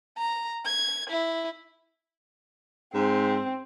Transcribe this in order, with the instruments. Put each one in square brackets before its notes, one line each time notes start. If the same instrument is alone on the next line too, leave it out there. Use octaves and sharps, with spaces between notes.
[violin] A#5
G#6
E4
[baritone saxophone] G#2 [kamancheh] C4